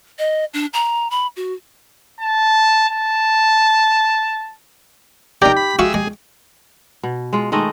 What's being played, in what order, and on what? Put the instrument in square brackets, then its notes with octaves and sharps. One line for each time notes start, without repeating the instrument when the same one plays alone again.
[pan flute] D#5
D4
A#5
B5
F#4
[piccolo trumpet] A5
A5
[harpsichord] D#4 D5 [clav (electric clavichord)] G4 [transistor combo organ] A#4 G5
[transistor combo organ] B5
[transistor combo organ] G#3 E5 [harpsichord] F#4 F5 C#6
[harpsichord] G#3 [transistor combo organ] G#4
[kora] B2
G#3 F4
D#3 G#3 A3 D#5